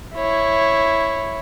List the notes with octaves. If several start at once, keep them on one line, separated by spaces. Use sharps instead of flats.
E4 C#5